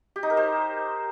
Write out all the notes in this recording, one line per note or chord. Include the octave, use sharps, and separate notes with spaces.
G4
D#4
A#4
C5